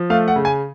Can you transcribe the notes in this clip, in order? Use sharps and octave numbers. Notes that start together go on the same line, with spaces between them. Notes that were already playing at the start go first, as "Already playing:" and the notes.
Already playing: F3
A3 F5
F#5
C#3
G#5